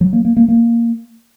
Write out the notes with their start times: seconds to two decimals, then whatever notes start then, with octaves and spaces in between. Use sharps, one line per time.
0.01 F#3
0.13 A#3
0.25 A#3
0.37 A#3
0.48 A#3